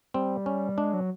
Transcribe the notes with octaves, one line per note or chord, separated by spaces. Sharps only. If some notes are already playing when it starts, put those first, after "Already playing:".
G3 C4
C#4
G#3 D4
F#3